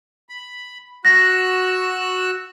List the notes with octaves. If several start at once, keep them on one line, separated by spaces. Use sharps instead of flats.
B5
F#4 E6 F#6 A#6